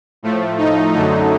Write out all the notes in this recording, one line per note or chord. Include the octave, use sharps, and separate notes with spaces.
A2 F3 A3
D#4
F#2 D3 F#3 A3 D#4